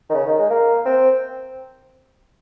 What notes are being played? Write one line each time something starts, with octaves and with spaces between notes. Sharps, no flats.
D#3
C#3
D#3
G#3
A#3
C4